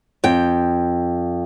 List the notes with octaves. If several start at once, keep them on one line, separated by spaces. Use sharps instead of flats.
F2 G5